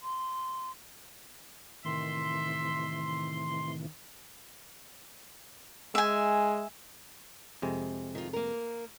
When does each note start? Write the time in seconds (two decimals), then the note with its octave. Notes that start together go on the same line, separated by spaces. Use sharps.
0.02 C6
1.85 A2 C3 D#3 E3 E5 C6
5.95 G#3 E5 G#5
7.62 F2 C3 G#3
8.15 D#3 F4
8.33 A#3 A#4